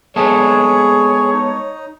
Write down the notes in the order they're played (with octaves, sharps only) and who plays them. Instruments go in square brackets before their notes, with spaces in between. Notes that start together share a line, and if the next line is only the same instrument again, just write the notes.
[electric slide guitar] G#3 B3 A4 [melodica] G#4 [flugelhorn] C#5
[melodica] D#4